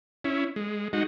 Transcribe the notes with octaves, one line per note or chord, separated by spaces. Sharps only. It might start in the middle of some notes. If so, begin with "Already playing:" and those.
C#4 E4
G#3
G#3 D#4 F#4